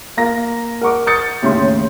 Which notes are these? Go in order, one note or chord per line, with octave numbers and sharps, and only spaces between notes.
A#3 F5 A#6
A#4 F#5 C#6 D6
D6 D#6 G6 A6 C#7
D#2 A2 C#3 C#4 C6